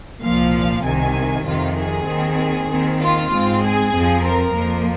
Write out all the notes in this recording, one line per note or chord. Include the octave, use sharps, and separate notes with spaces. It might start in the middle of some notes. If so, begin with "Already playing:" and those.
C2 A#2 F3 F5
C2 C3 D#3 G#5
F2 C3 D#3 F4
G#4
D#2 D#3 C4
D#2 D#3 C4
F4
G#2 G#3 C4
G#4
F2 F3 C4
A#4
F2 F3 A#3